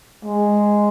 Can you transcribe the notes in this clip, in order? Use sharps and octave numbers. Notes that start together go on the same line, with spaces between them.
G#3